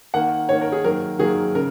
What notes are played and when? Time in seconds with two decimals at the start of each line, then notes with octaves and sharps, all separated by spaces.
0.14 D#3 A#3 F#5
0.49 D#3 A#3 C#5
0.61 A#4
0.72 G#4
0.84 D#3 F#3 A#3 A#4
1.19 D#3 F#3 A#3 G#4
1.55 C#3 A#4